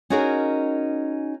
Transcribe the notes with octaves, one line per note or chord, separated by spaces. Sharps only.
C#4 D#4 F#4 G#4 A#4